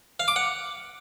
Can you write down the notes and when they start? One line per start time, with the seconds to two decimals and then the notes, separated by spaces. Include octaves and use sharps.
0.20 F5
0.28 D6
0.36 F#5